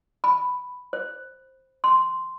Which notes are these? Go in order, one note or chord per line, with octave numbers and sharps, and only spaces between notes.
B5
C5
C6